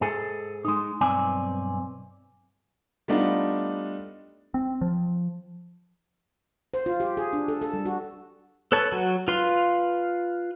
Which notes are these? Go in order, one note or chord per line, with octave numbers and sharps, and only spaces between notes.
G#2 G#4 A4
G#3 D#4
B1 G2 C4 D5 G#5
G3 A3 B3 D4 D#4 F4
C4
F3
C5
F4
G4
G#4
D4
A4
A4
G3
F#4
A4 B4 C#5 A5
F#3 F#4
F4 B4 F5 C6